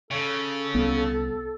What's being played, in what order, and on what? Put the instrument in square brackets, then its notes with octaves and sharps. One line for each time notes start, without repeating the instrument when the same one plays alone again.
[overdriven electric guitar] C#3 [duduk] A4
[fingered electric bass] C2 [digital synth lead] B3